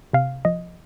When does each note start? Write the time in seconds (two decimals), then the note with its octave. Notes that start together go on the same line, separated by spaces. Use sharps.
0.13 C3 F5
0.45 F3 D#5